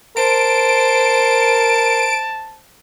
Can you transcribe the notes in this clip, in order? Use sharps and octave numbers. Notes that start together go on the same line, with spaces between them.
A#4 C5 A5 D7